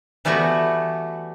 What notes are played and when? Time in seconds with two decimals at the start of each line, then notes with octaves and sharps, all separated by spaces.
0.25 E3 G3 A3 B3 F#4